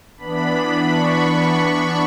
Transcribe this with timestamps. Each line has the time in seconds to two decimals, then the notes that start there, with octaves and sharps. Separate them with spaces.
0.17 E3 B3 D4 B5
0.90 C#6